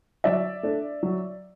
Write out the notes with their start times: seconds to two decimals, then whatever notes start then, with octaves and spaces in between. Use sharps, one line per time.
0.24 F#3 D5 E5
0.63 A3 D4
1.03 F#3